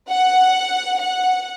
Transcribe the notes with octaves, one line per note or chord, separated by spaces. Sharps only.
F#5
F#5